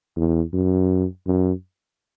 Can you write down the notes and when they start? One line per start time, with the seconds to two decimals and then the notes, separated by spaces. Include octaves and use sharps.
0.16 E2
0.53 F#2
1.27 F#2